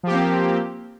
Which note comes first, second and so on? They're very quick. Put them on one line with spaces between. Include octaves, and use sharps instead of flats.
F3 G4 A#3 C4